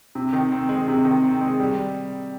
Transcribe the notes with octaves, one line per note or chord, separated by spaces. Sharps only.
C3
D#3
C4
G#3
C3
D#3
C4
G#3
G3